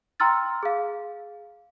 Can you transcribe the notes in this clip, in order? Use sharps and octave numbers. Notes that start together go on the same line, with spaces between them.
G5 A#5 C6 E6 F6 A6
G#4 F5